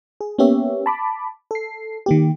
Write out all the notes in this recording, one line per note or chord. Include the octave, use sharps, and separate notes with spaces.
G#4
A#3 B3 C#4 G4 C#5 E5
A5 B5 D6
A4 C7
D#3 A#3 G4